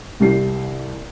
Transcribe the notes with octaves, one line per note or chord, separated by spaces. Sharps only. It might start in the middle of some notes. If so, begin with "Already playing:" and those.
C2 G4 C7